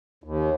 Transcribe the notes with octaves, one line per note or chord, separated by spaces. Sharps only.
D#2